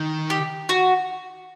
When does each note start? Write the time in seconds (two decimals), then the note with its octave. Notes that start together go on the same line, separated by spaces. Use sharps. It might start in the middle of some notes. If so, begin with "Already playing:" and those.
Already playing: D#3
0.30 G4
0.69 F#4